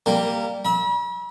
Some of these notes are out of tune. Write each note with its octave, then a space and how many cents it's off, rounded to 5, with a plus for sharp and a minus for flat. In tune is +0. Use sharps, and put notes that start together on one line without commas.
G3 +0 A#3 +0 A#4 -25
E5 -25 B5 -45